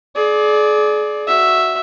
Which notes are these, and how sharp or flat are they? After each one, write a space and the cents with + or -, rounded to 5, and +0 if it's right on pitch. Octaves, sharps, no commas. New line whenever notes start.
G#4 +35 D5 +0
F#4 +0 E5 +0